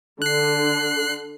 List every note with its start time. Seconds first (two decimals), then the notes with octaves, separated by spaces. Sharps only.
0.22 D3 F#6 C7